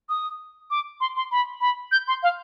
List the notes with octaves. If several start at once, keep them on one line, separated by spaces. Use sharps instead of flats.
D#6
D6
C6
C6
B5
B5
G6
C6
F5